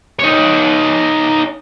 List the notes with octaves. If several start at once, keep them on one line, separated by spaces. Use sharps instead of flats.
D#4 C#5